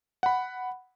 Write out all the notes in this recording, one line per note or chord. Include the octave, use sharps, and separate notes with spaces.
F#5 B5